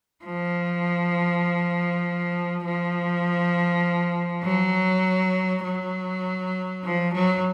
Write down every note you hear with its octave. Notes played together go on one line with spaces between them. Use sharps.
F3
F3
F#3
F#3
F3
F#3